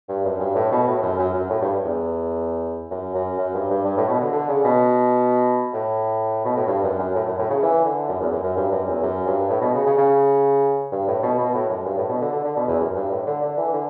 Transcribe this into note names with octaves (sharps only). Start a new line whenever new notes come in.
G2
F#2
G2
A2
B2
A2
F#2
F#2
F#2
A2
G2
E2
F#2
F#2
F#2
G2
G2
G2
A2
B2
D3
D3
C#3
B2
A2
B2
A2
G2
F#2
F#2
A2
F#2
A2
C#3
E3
D3
F#2
E2
F#2
F#2
G2
F#2
E2
F#2
G2
A2
B2
C#3
C#3
C#3
G2
A2
B2
B2
A2
F#2
G2
A2
B2
D3
D3
D3
B2
E2
F#2
G2
A2
D3
D3
E3
D3